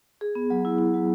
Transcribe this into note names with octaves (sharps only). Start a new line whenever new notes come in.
G#4
B3
F#3
E4
E4
F#3